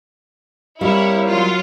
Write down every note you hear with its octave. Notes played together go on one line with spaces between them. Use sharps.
G3 A#3 C4 E4 G4 C#5
F#3 F4